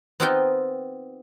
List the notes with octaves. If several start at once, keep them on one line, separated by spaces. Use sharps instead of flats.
B3 C4 D#4 F4 G4 G5